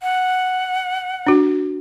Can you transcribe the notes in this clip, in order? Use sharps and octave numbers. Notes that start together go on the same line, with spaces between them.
F#5
D4 F#4